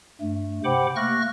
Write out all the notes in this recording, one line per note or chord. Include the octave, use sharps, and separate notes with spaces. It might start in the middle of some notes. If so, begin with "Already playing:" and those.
G2 A3
C3 C5 F#5 G5 B5 D6
A3 A#3 C#6 F6 F#6 A#6